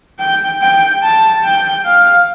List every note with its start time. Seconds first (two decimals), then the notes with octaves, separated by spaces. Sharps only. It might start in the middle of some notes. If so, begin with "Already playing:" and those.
0.19 G5
0.61 G5
1.03 A5
1.44 G5
1.85 F5